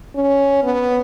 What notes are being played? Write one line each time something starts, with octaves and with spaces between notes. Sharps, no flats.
C#4
B3